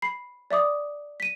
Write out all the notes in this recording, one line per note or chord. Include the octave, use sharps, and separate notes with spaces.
B5 C7
D5 E5 D6 D#6
B6 D#7